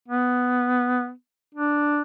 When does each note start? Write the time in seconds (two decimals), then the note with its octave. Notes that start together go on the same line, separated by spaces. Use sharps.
0.08 B3
1.55 D4